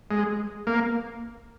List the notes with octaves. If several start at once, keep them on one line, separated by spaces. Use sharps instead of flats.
G#3
A#3